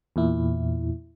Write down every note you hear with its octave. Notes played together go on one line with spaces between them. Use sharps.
E2 A#2 E4